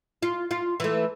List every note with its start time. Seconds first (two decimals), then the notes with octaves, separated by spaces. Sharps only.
0.23 F4
0.51 F4
0.80 E3 A3